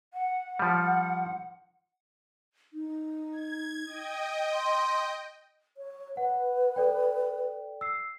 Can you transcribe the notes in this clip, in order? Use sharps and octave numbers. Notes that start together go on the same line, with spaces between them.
F#5
F3 G3
D#4
G#6
D#5 G5
C6
C#5
B4 F#5
A4 D5 G5
E6 C7